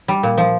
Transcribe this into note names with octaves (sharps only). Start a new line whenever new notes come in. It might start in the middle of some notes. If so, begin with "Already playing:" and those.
G3
A#2
F3